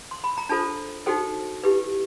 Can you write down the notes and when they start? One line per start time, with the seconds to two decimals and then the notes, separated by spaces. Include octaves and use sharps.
0.11 C6
0.24 B5
0.38 A#5
0.49 D4 F4 A4 C5 A5
1.06 D#4 F#4 A4 C5 G5
1.63 E4 G4 B4